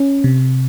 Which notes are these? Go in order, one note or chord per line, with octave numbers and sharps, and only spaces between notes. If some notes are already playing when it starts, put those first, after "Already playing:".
Already playing: C#4
C3